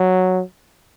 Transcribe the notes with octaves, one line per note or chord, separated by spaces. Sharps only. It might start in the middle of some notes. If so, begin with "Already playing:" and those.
Already playing: F#3